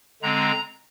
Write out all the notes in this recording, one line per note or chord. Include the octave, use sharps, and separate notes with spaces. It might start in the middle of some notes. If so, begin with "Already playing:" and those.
D3 G#3 C4 A#5